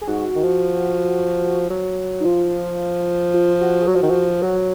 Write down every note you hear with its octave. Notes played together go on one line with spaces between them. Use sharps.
G#4
G#2 F#4
D#3
F3
F#3
D#4
F3 F4
F4
F#4
G#4
F#3 F#4
F3
D#3
F3
F#3 F#4